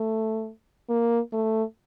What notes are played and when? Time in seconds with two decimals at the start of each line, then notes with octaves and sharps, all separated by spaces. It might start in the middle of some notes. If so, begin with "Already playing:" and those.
Already playing: A3
0.89 A#3
1.33 A3